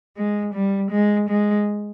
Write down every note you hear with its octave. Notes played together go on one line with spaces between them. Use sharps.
G#3
G3
G#3
G#3